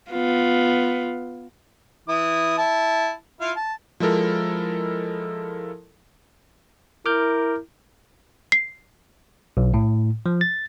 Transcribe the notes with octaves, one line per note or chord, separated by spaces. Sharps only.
B3 F4
E3 E4 D#6
E4 A5
E4 F4 F5
A5
F3 G#3 E4 A4 A#4
E4 A#4 D6 F6 G6
C7
B1
A2
F3
A6